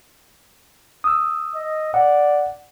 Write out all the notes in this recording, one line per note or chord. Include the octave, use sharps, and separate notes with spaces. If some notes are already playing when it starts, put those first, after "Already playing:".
D#6 E6
D#5
D5 F#5